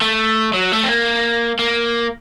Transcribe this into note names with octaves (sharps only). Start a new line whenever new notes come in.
A3
F#3
A3
C4
A#3
A#3